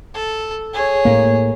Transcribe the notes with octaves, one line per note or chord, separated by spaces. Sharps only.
A4
G#4 C#5
A2 A#3